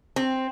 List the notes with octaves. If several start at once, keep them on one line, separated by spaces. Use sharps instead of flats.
C4